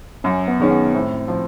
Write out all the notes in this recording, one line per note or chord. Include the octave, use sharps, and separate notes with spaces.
F#2 C#4
B3
D#3 G#3 C#4
B3
A2 C4
F3